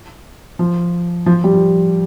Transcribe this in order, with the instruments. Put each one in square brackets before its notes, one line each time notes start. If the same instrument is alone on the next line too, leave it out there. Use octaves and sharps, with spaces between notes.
[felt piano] F3
F3
G3
F3